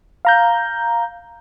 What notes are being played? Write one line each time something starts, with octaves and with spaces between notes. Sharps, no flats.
F5 A#5 G6